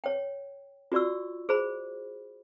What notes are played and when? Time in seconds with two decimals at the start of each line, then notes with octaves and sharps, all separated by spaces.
0.04 C#5 G5
0.92 F4 F#4 D5 C#6 E6
1.49 G#4 C5 B5